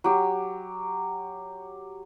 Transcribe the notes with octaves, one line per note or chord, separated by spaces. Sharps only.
F#3 G4